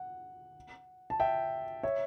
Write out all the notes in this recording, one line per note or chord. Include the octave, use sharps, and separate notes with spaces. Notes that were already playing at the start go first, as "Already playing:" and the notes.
Already playing: F#5
A5
E5 G5
C#5 E5